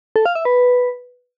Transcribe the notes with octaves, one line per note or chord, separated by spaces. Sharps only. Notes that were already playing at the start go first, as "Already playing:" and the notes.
A4
F5
E5
B4